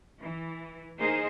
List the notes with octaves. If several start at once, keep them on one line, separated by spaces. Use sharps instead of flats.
E3
A#3 D#4 G#4 A#4 C5 D#5